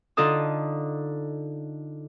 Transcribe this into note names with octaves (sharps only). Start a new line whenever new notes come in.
D3 D#4 F4 A4 D#6